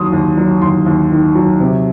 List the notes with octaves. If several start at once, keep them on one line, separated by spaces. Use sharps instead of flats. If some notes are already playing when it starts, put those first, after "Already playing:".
Already playing: D#2 F#3 C6 D#6
D#2
F#3
D#2 C6
D#2
D#3
F#3
C3